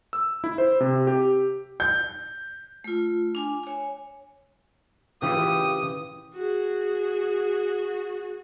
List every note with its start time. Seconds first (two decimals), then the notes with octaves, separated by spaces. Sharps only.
0.13 E6
0.44 E4
0.58 C5
0.81 C3
1.07 G4
1.80 G6
2.84 A3 F4
3.35 D4 G#5
3.63 C#5 G#5
5.22 C#3 E3 F4 G4 D#6
6.34 F#4 G#4